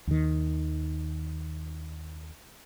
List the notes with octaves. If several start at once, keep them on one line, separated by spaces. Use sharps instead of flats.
D#2 D#3